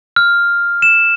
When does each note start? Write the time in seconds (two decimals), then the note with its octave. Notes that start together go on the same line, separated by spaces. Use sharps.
0.16 F6
0.82 E7